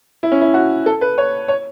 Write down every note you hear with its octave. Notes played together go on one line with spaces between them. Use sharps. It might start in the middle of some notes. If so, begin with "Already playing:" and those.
E4
C#4
E4
F#4
A4
B4
C#5
C#5